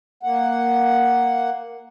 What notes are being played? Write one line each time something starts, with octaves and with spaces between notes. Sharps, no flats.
A#3 F#5